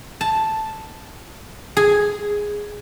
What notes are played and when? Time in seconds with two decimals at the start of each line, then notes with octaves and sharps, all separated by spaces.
0.21 A5
1.77 G#4